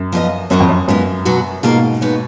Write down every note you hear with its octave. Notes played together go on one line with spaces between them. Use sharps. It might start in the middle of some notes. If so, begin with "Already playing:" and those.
Already playing: F#2
F3 B3 F4 B4 D#5
F#2 F#3 C#4 F#4 A#4 D#5
F2
F#2
F#2 G#3 B3 F4
B2 F#3 B3 F#4
G#2 B2 A#3 F4 G#4
B3 D#4 G#4 C#5